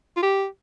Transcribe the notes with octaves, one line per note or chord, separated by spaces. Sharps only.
F4
G4